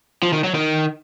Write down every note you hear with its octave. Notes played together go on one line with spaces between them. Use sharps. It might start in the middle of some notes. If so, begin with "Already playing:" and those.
F3
D#3
F#3
D#3